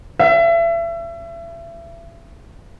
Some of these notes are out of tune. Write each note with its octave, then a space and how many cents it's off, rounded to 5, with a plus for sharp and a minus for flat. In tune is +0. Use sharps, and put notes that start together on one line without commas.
E5 +35